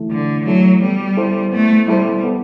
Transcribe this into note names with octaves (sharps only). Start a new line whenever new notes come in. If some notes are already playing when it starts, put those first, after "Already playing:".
Already playing: E3 A3 E4 A4
D3 E3
F#3 A3 E4 A4
G3 B3
E4 A4 C5
A3 B3
G3 E4 A4 C5
B3